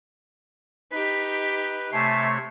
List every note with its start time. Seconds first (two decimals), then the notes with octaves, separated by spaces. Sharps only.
0.91 D#4 G4 B4 B6
1.92 C3 A3 C#5 E5 G#5 A5 C7